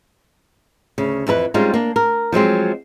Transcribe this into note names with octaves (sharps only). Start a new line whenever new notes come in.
D2 C#3
F2 E3 A4 B4
G3 G#3 C4 C#4 D#4 F4
A#3 D4
A#4
F3 F#3 G#3 C4